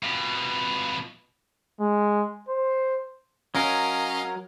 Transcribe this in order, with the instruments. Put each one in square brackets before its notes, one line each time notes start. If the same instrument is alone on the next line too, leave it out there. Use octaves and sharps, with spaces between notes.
[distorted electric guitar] F2 B2
[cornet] G#3
C5
[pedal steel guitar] F#3 A#4 [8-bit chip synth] C#4 D#5 F5